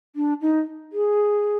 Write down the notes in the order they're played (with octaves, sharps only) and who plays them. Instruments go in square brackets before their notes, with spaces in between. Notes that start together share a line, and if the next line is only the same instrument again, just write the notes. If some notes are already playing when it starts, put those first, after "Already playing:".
[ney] D4
D#4
G#4